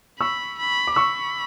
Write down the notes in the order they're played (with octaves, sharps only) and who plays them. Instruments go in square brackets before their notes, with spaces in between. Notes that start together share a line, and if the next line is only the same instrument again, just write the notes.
[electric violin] B5 [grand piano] C#6 E6
[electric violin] B5
[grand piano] D6
[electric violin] B5 [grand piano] C#6 E6